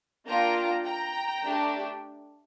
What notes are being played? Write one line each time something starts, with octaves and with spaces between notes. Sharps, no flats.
A#3 D4 F4 G5 A#5
G5 A#5
A3 D4 G4